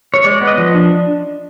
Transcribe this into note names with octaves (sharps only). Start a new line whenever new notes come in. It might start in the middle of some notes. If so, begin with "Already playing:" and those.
C#5
G#3 D5
B3
D#5
F3
D4